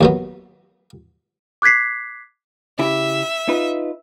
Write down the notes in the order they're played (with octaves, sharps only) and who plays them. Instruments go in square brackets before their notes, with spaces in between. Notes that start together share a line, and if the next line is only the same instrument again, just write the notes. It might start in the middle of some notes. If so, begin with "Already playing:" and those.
[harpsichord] D#2 F#3 B3
[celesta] D6 F#6 G#6 B6 C7
[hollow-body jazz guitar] C#3 E4 G4 [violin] E5
[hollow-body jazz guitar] D#4 F4 B4